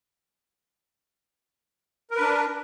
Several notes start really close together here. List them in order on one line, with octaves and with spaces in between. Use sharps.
A#4 B4 D4